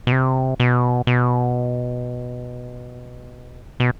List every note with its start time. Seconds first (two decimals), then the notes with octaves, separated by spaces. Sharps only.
0.07 B2
0.12 C3
0.60 B2
1.07 B2
3.80 B2